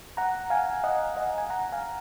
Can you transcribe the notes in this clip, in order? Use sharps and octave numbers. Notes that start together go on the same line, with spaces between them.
F#5 A#5
F5 G#5
D#5 F#5
D#5 F#5
G#5
F#5 A#5
F5 G#5